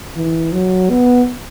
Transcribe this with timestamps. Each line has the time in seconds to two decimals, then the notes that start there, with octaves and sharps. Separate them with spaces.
0.16 E3
0.53 F#3
0.90 B3